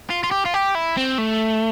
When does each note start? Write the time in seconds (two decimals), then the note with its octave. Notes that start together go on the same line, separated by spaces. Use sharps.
0.10 F4
0.24 F4
0.31 G4
0.46 F4
0.54 G4
0.75 E4
0.97 C4
1.18 A3